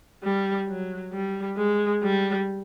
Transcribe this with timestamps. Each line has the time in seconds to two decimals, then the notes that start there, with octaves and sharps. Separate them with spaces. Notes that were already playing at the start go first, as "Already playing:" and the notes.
0.24 G3
0.68 F#3
1.13 G3
1.57 G#3
2.03 G3